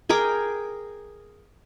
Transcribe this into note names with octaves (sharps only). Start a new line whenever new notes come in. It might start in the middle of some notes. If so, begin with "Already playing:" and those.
G#4 A#4 G5 D6